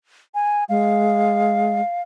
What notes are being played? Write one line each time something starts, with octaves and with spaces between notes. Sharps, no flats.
G#5
G#3 F5